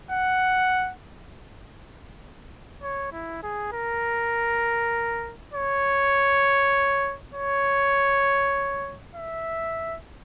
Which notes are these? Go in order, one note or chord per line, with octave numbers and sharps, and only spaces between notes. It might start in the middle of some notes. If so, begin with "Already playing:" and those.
F#5
C#5
E4
G#4
A#4
C#5
C#5
E5